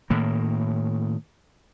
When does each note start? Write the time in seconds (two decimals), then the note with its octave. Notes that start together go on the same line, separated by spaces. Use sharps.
0.10 A2 D#3 A#3